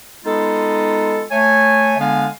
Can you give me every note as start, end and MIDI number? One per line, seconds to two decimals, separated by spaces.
0.24 1.22 56
0.24 1.22 59
0.24 1.22 63
0.24 1.22 65
0.24 1.22 69
1.31 1.97 57
1.31 1.97 73
1.31 1.97 80
1.98 2.26 50
1.98 2.26 56
1.98 2.26 59
1.98 2.26 62
1.98 2.26 77
1.98 2.26 80